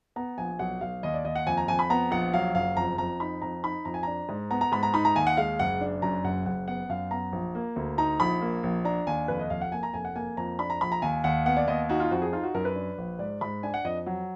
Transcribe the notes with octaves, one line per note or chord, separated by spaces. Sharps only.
B3 A#5
A#1 G#5
B1 F#5
B1 F5
D#2 D#5
D5
D#2 D#5
F#5
F2 G#5
A#5
F2 G#5
B5
B3 A#5
A#1 F#5
F#3 F5
F#1 F5
F2 A#5
F2 A#5
D#4 B5
F2 A#5
D#4 B5
F2 A#5
G#5
D4 A#5
G#2
B3 A#5
A#5
G#2 B5
A#5
D#4 B5
A#5
D#2 G#5
F#5
G#3 F5
F#1 F#5
D4
F#2 A#5
F#1 F#5
F#1 F#5
B3 F#5
F#2 F5
B3 A#5
A#1
A#3
D2
D#4 A#5
A#1 B5
A#3
A#1
D4 A#5
D#2 G#5
F1 B4
D#5
F1 F5
F#5
A#3 G#5
A#5
F1 G#5
F#5
A#3 G#5
F2 A#5
D4 B5
A#5
A#1 B5
A#5
D#2 G#5
D#2 F#5
B3 F#5
D5
D#2 D#5
D#4 F#4
F4
F2 F#4
G#4
D#4 F4
F#4
F#2 A#4
B4
D4
A#1
G#2 D5
G#2 B5
D4 G#5
F#5
F2 D#5
F#3